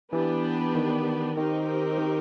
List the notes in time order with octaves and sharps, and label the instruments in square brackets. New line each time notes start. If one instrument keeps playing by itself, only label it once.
[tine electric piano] E3 [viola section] B3 D4 G4 B4
[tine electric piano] D#3
[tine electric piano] D#3 [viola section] C4 D#4 G4 A#4
[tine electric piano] D#3